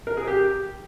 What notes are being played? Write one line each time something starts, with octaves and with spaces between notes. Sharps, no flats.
A#4
G#4
G4